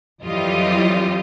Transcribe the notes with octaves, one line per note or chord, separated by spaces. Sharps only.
F2 E3 F#3 G3 F4 D#5